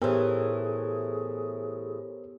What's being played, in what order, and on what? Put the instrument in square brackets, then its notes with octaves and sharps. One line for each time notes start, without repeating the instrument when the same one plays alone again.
[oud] A2 E3 [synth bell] B3 G4 [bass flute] G#4 [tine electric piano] A#4 C5 C#5